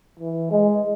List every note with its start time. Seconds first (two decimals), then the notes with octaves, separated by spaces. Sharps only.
0.19 E3
0.51 G#3